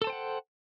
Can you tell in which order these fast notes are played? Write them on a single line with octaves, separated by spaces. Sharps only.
A4 A5 C5 G5 F#5